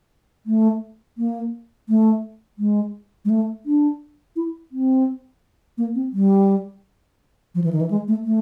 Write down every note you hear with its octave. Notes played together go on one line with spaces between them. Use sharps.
A3
A#3
A3
G#3
G#3
A3
D4
E4
C4
A#3
C4
G3
F3
E3
D#3
E3
G#3
A3
A3